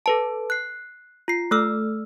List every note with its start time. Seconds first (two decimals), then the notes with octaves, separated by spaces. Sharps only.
0.06 A4 B4 A5
0.50 F#6 C7
1.28 F4 C7
1.51 A3 A4 E6 F6